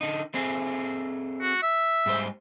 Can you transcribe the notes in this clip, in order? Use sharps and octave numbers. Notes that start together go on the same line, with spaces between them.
D3 D#4
A3 C4 G#4
F#4
E5
G#2 G3 C5